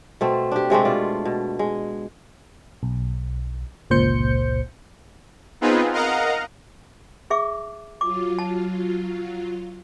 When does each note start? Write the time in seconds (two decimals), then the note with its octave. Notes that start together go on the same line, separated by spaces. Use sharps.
0.21 B2 A3 C4
0.51 D4 G4
0.70 C3 G#3 A3 C4
0.85 B2 F4 D5
1.25 B2
1.59 G#3
2.83 B1
3.90 G1 C#2 A#2 C5 G6 C#7
5.61 B3 C4 D#4 F4 G#4 B4
5.92 A#4 D#5 F5 F#5 A#5
7.30 G#4 E5 D6
8.01 F#3 F4 D6
8.39 A5